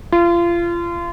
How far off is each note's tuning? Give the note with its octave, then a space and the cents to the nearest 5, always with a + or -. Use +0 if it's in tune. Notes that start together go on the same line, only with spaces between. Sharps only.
F4 -30